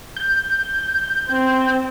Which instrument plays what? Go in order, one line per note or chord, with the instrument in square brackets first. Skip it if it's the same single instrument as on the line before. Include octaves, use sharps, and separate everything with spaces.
[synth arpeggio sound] G6
[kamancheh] C4